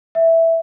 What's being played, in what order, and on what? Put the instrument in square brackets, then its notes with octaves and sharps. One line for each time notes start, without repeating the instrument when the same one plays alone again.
[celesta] E5